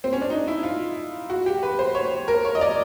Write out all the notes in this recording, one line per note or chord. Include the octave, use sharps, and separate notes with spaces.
C4
C#4
D4
D#4
E4
F4
F#4
G4
B4
C5
C#5
A#4
C#5
D#5
D5